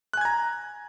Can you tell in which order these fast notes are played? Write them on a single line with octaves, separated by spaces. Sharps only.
F#6 G#5 G#6 A#5